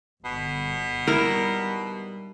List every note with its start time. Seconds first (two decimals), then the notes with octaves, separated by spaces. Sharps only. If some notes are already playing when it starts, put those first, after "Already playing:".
0.25 G1 B2
1.07 G3 D#4 E4 A#4